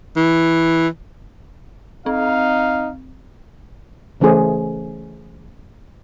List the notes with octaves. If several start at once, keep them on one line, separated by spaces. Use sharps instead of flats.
E3
C4 D#4 F5
C#3 E3 A3 C#4 G#4 C5